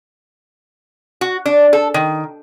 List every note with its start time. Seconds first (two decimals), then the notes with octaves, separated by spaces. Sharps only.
1.21 F#4
1.46 D4
1.73 A4
1.94 D#3